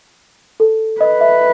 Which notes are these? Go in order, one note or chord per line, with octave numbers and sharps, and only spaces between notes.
A4
B4 D#5
E5